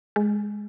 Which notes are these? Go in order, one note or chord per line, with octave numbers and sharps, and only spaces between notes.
G#3